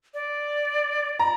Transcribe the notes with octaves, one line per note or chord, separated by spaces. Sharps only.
D5
A#5 B5